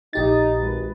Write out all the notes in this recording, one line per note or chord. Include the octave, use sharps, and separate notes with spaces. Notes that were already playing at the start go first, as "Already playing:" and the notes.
A#1 D#4 G4 A6
G#1 B4